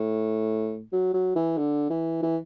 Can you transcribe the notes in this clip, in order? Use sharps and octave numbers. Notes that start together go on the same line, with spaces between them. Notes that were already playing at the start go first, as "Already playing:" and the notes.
Already playing: A2
F#3
F#3
E3
D3
E3
E3